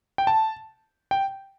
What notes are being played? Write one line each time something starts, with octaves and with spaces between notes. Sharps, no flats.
G5
A5
G5